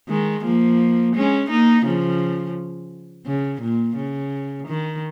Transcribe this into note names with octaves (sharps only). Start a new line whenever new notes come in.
D#3 G#3
F3 A#3
G#3 C#4
A#3 D#4
C#3 F3
C#3
A#2
C#3
D#3